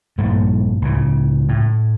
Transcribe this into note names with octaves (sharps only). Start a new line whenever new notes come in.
A#1 G2 A3 A#3
C#2 A2 C#3
A2